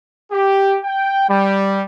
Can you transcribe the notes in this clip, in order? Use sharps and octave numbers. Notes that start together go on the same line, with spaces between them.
G4
G5
G3